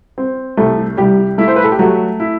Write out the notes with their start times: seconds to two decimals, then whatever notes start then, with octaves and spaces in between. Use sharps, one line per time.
0.18 C4
0.57 C2 A3 A4
0.97 C2 G3 G4
1.38 A3 E4
1.48 C5
1.56 B4
1.64 A4
1.72 G4
1.79 F#3 A3 F#4
2.20 E4